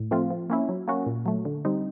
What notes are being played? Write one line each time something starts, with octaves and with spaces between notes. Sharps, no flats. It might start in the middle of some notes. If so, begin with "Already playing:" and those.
Already playing: A2
F3 A3 C4 F4
F3
A#3 C#4 E4
F#3
A#3 C#4 F#4
A#2
F#3 A3
D3
G3 C4 D#4